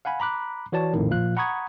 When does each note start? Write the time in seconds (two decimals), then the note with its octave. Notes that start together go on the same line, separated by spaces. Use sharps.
0.05 F5 F#5 G#5 B5
0.20 A#5 B5 D6 F#6
0.72 E3 F#4 C#5 D5 A5
0.93 A#1 F2 A2 D#3
1.11 A#2 F3 F5 F#6
1.37 F#5 A#5 B5 C#6 D#6 G#6